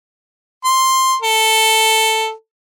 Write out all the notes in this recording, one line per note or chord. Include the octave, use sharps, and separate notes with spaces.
C6
A4